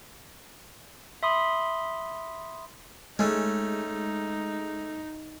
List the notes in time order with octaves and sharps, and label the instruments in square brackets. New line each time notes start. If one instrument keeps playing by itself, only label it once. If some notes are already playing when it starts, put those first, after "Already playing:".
[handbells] E5 B5 C6 D#6
[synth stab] G#3 [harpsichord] A3 C#4 [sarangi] D#4